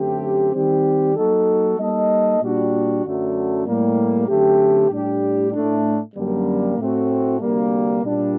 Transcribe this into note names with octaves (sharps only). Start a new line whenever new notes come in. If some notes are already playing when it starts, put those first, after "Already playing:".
Already playing: F#2 D3 A3 C4 G4
D#3 G3 C4 G4
F#3 A#3 D#4 F#4 A4
G3 A#3 D#4 A4 D#5
A#2 G3 D4 F#4
F#2 D3 F#3 A3
A2 G3 A#3
F#2 D3 A3 C4 G4
A2 G3 D4 G4
A2 A3 D4
F#2 D3 G3 A#3
A2 A3 C4 F#4
D2 C3 G3 A#3
A#2 G3 D4